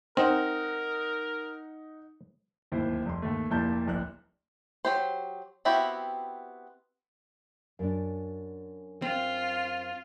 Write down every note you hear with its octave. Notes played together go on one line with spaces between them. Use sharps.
C4 D#4 A#4 F#5
D1 D#2 E4 C5
F1 C6
D#2 A3
F1 A#2 E4 A5 G6
D1 A#1 F#6
F#3 G4 C5
B3 C4 E4 F#4 G4
F#2 D4
C4 F4